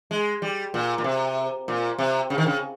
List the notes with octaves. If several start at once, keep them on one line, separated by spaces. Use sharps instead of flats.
G#3
G3
A#2
A#2
C3
A#2
C3
C#3
D#3
C#3